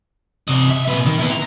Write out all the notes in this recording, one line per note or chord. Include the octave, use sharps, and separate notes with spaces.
C3 D#5
E5
A#2 B4
D#3
B3 E4
A#5